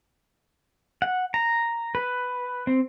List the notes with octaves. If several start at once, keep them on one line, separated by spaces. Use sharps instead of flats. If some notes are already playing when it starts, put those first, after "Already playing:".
F#5
A#5
B4
C4